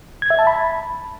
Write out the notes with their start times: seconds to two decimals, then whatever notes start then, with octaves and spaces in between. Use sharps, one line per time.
0.22 G#6
0.30 E5
0.39 A5
0.47 B5